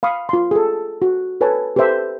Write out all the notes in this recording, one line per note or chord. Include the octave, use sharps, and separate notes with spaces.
F5 B5 C#6 D#6
F4 C6
G#4 A4
F#4
A4 B4 C#5 G#5 A5
G4 A4 B4 C5 E5